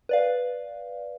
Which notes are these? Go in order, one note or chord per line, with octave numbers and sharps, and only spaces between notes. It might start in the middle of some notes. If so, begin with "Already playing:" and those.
B4 D5 F5